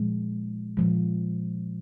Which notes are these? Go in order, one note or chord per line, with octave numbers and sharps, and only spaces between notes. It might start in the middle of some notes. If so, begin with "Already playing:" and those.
Already playing: A#2 F3 G#3
A#2 F3 G#3